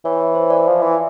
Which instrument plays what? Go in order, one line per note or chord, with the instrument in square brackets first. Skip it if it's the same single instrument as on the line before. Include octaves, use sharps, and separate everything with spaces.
[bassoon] E3 [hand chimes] C#5
[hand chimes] C#5
C5
D5
[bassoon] F3
E3